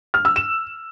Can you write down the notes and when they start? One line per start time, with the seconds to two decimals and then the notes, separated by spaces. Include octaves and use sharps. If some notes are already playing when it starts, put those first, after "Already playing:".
0.14 F6
0.25 E6
0.36 E7